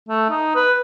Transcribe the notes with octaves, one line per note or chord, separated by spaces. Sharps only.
A3
D#4
B4